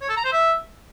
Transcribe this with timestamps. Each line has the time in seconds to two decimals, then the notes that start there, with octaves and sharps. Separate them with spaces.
0.01 C#5
0.09 A4
0.17 A#5
0.25 C5
0.32 E5